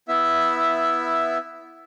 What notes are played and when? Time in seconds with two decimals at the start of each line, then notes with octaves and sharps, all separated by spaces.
0.08 B3 E4 E5